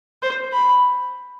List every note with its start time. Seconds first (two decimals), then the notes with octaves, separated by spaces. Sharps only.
0.22 C5
0.53 B5